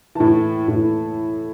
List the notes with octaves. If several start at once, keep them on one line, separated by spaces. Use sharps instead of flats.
A2 E3 A5
A2 E3